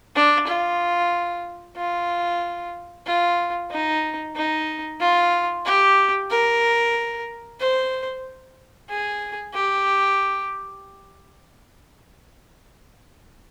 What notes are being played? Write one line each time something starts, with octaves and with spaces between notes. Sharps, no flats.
D4
F4
F4
F4
D#4
D#4
F4
G4
A#4
C5
G#4
G4